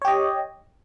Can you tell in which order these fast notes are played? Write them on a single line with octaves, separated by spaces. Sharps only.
C#5 G4 D#5